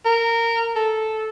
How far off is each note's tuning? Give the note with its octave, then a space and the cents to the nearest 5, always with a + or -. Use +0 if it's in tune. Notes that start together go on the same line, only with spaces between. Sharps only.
A#4 -15
A4 -10